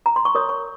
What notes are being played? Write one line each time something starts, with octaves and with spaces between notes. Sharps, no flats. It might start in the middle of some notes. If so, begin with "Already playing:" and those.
A#5
C6
C#6
G4 A#4 C#5 D#6
C#6